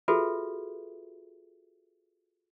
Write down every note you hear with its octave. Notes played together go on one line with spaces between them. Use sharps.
F4 F#4 G#4 A4 B4 E5